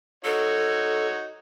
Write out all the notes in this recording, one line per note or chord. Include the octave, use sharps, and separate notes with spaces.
D#4 F#4 A4 C#5